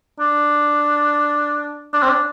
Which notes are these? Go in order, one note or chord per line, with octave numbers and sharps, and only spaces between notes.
D4
D4
C4
D4